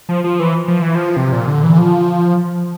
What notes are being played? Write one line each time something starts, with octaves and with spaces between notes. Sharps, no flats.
F3
F3
E3
F3
E3
F3
C3
A#2
D3
E3
F3